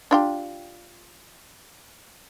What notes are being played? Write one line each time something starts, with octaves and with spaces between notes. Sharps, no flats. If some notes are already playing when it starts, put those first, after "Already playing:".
D4 F4 G4